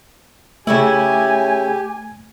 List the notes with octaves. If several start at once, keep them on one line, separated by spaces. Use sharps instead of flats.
C#3 A3 C#4 E4 G4 G#5